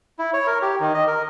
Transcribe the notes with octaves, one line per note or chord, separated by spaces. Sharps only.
E4
C#5
A#4
G4
D#3
D#5
A#4